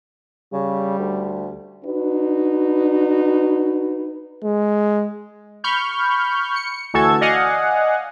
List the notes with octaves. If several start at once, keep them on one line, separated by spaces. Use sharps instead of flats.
C#3 G3
D2
D4 D#4 F#4 B4
G#3
B5 C#6 F6 G6
C#7
D2 E3 F#4 A4 A5 G#6
D5 D#5 F5 F#5 G#5